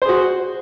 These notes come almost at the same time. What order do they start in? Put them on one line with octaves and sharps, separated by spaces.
C5 G#4 F#4